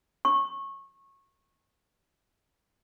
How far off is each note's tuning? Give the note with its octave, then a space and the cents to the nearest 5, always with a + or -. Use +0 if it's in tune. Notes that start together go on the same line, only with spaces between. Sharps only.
C#6 -20